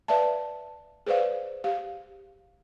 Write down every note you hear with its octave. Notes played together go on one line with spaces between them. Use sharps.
B4 D5 E5 F5 A5
G#4 B4 C5 D5 F5
G4 F5